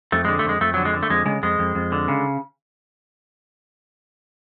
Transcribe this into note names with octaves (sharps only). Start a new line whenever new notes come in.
F2 A3
D3 G#3
A3
F2 G#3
F2 A3
D3 F#3
G#3
D3
A3
F2 G#3
C#3 G#3
F2 G#3
F2
F2
D3
C#3